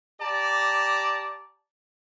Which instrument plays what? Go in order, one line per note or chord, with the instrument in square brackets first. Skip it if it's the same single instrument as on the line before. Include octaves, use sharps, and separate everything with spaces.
[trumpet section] G4 D5 A5 A#5